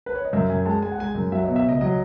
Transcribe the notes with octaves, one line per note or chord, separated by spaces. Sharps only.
B4
C#5
D#5
F#2 E5
F#2 G#5
G#3 A5
G#3 G#5
F#5
G#3 G#5
F#2
F#3 E5
B2 D#5
E5
C#2 D#5
F#3 D#5